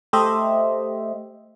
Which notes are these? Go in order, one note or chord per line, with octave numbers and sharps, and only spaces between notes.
A3 G4 C5 D#5 E5